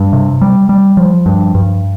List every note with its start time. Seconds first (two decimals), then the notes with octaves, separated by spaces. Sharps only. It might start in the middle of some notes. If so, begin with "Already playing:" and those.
Already playing: G2
0.13 C3
0.41 G3
0.69 G3
0.97 F3
1.26 G2
1.55 G2